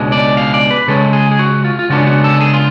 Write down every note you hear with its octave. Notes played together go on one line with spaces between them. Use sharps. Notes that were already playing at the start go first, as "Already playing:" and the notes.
Already playing: C#2 B2 G#3 D4
D5
F5
D5
B4
C#3 G#3 C#4 A4
G#4
G#4
F#4
F4
F4
C#3 G#3 B3 D4 F#4
F#4
A4
G#4
F4